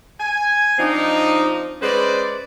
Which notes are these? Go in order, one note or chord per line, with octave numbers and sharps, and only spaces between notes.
G#5
F3 C4 D4 D#4
G#3 C#4 B4 C5 D5